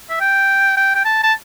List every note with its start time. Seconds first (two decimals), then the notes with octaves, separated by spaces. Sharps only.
0.10 E5
0.21 G5
0.77 G5
0.95 G5
1.05 A5
1.23 A5